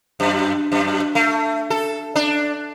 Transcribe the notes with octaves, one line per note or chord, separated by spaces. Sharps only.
F#2
F#2
A3
A4
D4